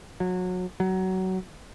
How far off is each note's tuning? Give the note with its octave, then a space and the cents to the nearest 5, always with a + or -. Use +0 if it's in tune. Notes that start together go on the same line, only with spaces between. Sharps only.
F#3 -25
F#3 +20